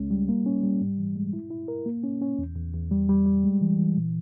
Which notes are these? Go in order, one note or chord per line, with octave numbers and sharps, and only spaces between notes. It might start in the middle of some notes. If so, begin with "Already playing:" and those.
Already playing: C#2 G#3 C#4
G3
A#3
C#4
G3
G#2
E3
G#3
E4
E4
A#4
A#3
C#4
C#4
E2
E2
E2
G3
G3
G3
G#3
E3
E3
A#2